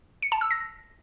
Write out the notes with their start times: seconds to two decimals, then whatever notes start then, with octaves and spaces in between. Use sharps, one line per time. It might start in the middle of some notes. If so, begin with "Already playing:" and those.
0.22 C#7
0.32 A5
0.41 E6
0.51 A#6